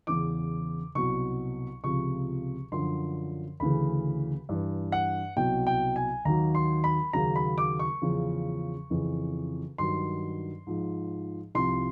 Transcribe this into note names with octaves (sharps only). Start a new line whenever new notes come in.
E2 C#3 E3 D6
C2 B2 F#3 C#6
C#2 C3 F3 C#6
F#2 D3 F3 C6
D2 C#3 E3 B5
G2 E3
F#5
C2 B2 F#3 G5
G5
G#5
D#2 D#3 F#3 A#5
C6
B5
D#2 C#3 F#3 A#5
B5
D6
C#6
E2 C#3 F3
F2 C#3 E3
G2 D#3 F#3 C6
G#2 F3
C2 C3 F3 C6